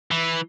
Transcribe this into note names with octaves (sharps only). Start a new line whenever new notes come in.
E3